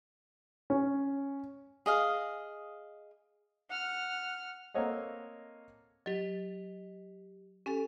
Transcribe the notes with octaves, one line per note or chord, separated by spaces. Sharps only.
C#4
G#4 D#5 F5
F#5 F6
A#3 C4 A4 C#5 D#5 F#5
F#3 G4 D#5
C#4 G4 A4 G#5